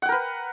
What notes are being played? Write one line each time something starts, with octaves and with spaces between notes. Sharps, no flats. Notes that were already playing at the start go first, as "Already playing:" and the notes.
A#4 B4 F#5 G5